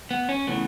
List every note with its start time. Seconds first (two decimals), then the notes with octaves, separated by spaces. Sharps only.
0.11 B3
0.29 C#4
0.47 C#3 E3 A3 B3